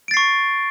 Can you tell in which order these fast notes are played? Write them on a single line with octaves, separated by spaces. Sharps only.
D7 A6 C7 C#6